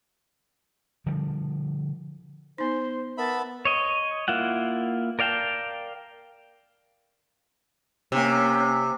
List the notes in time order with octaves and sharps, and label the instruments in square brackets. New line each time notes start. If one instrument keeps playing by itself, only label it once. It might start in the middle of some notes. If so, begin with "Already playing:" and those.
[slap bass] D3 F3 G3
[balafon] B3 D#4 [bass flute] C5 [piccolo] C6
[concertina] B3 E5 B5 [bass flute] A#4 [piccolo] A5
[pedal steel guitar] C#5 D#5
A#3 E4 F4 F#5
A#4 D5 F5 G5 A5
[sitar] C3 [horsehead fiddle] A#3 C#4